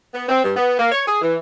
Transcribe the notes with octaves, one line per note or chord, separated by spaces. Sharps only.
B3
C4
G2
B3
A#3
C#5
G#4
E3